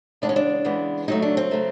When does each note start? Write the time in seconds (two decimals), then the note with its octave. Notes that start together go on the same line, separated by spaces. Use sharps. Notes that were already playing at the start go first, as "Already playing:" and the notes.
0.22 C#3 E3 G#3 B3 D4
0.29 C#4
0.36 D4
0.65 C#3 E3 G#3 B3
1.08 C#3 F#3 A3 D#4
1.22 D4
1.37 C4
1.51 C#3 F#3 A3